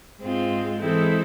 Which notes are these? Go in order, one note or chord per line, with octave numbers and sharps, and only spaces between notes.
G#2 G#3 C4 F4
E3 G#3 C4 E4 A4